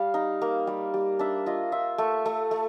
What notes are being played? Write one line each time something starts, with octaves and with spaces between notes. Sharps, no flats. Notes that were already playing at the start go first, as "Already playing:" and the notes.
Already playing: G3 F5
D#4
A#3
G3
G3
D4 E5
F4 D#5
F4 E5
A3
A3
A3